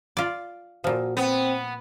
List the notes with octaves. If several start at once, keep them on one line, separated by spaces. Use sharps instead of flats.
F4 D5
A#2 F3 F#4
B3 C4